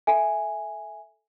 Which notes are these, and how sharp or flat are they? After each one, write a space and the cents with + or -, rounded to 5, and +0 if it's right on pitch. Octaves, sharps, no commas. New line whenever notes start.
A4 +0 E5 +0 G#5 +0